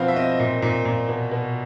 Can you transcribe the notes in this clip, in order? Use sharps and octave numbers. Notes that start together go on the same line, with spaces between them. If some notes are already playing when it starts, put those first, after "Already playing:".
Already playing: B2 F3 C4 B4 F5
E5
C4 D#5
A#2
A#2
A#2
B2
B2